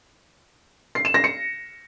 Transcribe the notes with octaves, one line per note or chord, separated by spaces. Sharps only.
C7
E7
A#6
C#7